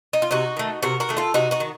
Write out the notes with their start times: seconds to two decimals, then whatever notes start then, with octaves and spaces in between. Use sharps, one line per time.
0.13 D#4
0.22 F4
0.31 C3 D#4 F#4
0.57 D#3 A3
0.83 C3 F#4 A#4
1.00 F#4 A#4
1.09 D#3 A3
1.17 F4 A4
1.34 C3 D#4 F#4
1.51 D#4 F#4
1.60 D#3